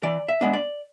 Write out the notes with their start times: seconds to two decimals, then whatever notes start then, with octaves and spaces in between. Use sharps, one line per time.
0.03 E3 D5
0.28 E5
0.41 G#3 B3 D4
0.53 D5